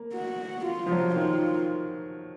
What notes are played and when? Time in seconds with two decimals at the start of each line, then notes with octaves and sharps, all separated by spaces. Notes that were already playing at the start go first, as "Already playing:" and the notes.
Already playing: A#3
0.14 F#4
0.66 F4
0.86 F3
0.92 F#3
1.16 D#3 F4